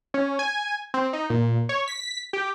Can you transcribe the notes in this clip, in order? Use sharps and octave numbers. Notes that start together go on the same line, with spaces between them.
C#4
G#5
C4
D#4
A#2
C#5
B6
G4